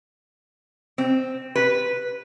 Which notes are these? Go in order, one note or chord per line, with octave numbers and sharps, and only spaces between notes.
C4
B4